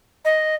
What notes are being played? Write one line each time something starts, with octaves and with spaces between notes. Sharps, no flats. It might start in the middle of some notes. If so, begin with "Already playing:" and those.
D#5